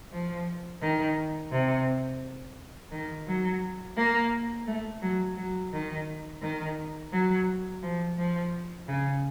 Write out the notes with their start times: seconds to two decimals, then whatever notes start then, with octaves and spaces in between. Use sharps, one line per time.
0.13 F3
0.82 D#3
1.52 C3
2.92 D#3
3.28 F#3
3.97 A#3
4.67 A3
5.02 F#3
5.37 F#3
5.73 D#3
6.42 D#3
7.13 F#3
7.83 F3
8.18 F3
8.88 C#3